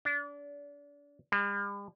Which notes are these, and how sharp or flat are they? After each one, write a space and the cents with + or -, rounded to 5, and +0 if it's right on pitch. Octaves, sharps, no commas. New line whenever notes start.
D4 -30
G3 +45